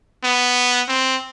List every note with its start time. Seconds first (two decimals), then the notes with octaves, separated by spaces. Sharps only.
0.24 B3
0.88 C4